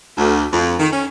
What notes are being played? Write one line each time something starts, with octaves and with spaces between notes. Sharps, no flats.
D2
F2
D#3
C#4